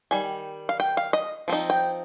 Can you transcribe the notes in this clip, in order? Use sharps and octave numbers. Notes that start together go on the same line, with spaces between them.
D#3 G3 G#5
F5
G5
F5
D#5
F3 C4 D#4
G5